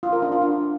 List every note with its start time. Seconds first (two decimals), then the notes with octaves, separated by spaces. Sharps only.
0.03 F4
0.13 A#4
0.22 D4
0.32 F4
0.42 D4